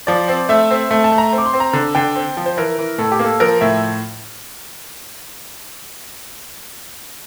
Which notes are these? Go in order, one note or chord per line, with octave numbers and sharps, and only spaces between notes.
F3 D5
C4
A3 E5
C4
A3
A5
A3
A#5
C4
D6
C6
C4
A#5
D3
D3 G5
C4
F3
C5
E3 A#4
E3
A2 A4
G4
A#3
A4
F3 A#4
A2 E5